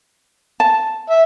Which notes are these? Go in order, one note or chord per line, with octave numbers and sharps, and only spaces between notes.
A5
E5